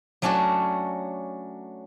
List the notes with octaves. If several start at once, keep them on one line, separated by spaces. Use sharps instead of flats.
F#3 A3 C#4 D4 F#4